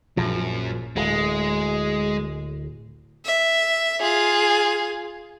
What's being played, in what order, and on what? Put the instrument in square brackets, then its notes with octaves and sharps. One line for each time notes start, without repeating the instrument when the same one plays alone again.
[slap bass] A#1 F3 [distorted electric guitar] F#2
[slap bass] D1 [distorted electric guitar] G#3
[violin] E5
F4 G#4